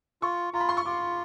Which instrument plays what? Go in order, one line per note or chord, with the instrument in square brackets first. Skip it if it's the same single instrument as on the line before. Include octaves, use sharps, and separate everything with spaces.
[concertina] F4 [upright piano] C#6
[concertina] F4 [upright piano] A#5
[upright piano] B5
C6
C#6
[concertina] F4 [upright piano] D6